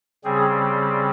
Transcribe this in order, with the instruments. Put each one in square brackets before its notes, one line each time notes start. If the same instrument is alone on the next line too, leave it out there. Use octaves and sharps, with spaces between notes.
[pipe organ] C#3 G3 C4 G#4